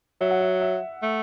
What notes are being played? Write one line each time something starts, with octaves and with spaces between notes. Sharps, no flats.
F#3 E5
F#5
E5
E5
A3